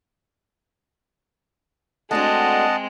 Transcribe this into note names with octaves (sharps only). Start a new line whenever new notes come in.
G#3 A3 C4 D4 F#4 D#5 F#5 A5